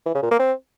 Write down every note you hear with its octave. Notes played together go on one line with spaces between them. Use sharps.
E3
C#3
A#2
A#3
C4